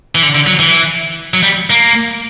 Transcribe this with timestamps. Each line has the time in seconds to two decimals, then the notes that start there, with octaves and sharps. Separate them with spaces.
0.15 E3
0.23 D3
0.35 D3
0.47 F#3
0.59 E3
1.34 F#3
1.43 G3
1.70 A#3